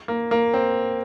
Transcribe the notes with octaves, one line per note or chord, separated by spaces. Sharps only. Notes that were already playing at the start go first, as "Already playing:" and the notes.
A#3
A#3
C4